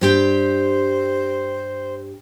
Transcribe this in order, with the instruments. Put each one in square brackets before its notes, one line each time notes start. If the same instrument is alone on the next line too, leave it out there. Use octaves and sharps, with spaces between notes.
[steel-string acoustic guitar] G2 G4 G5 [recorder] C5